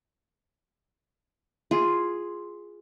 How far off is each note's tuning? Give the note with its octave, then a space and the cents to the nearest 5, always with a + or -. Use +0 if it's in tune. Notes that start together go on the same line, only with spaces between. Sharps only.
F4 +0 G#4 +0